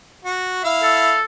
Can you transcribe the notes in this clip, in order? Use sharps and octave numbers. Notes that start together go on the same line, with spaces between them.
F#4
E4 F5
A4